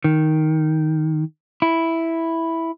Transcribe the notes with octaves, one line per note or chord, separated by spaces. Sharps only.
D#3
E4